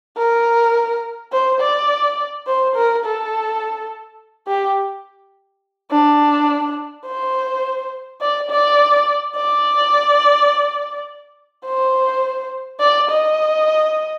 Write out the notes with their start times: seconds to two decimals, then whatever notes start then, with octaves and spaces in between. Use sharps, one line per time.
0.18 A#4
1.33 C5
1.60 D5
2.47 C5
2.76 A#4
3.05 A4
4.48 G4
5.91 D4
7.06 C5
8.21 D5
8.50 D5
9.36 D5
11.65 C5
12.80 D5
13.09 D#5